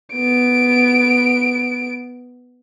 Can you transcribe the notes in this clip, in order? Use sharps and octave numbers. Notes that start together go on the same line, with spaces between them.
B3 D7